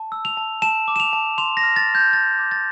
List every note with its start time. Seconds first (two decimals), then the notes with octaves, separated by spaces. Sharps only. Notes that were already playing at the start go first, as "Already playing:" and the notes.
Already playing: A5
0.12 E6
0.25 F7
0.37 A5
0.62 A5 E7
0.88 D6
0.96 E7
1.00 F7
1.13 A5
1.38 C6 F7
1.57 A#6
1.63 F6
1.76 A6
1.88 F6
1.95 G6
2.13 A5 A6
2.39 D6
2.51 A6